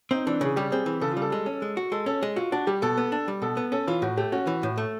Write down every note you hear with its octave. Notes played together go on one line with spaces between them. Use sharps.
C4 D#4
E3 D4
C#3 G#4
G3 G4
C4 G#4
E3
C#3 A4
F4
G3 A4
G#3
C#4
G#3
F#4
G#3 A4
C#4 A4
G#3
F4 F#4
D4 F#4
G3 G4
B2 A4
B3
D4
G3
B2 A4
B3
C#4 A4
E3 F4
A2 F#4
A3 G4
C#4 F#4
E3
A2
A3